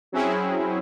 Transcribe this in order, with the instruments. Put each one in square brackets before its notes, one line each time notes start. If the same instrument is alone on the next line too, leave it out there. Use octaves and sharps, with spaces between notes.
[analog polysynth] F#3 C4 C#4 E4 G#4